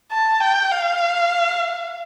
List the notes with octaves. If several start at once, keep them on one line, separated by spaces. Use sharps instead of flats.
A5
G5
F5